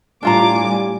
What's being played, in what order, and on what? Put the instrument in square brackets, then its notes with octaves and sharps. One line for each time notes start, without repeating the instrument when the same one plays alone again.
[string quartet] A2 G#5 D6 [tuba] G3 [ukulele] D4 F4 A#5
[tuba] G3